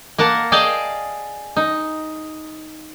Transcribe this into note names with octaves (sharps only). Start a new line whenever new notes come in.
A#3 A#4 F#5 A5
G#4 D5 D#5 F5 G5 A5
D#4